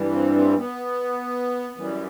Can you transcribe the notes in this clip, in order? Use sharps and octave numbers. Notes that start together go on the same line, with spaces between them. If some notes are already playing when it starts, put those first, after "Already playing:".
Already playing: G2 E3 G3
C4
C4
B3
F#2 E3 G3